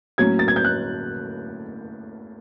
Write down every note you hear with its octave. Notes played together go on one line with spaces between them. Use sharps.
A2 F#3 A#3 C#4 G#6
A6
G#6
G6
F#6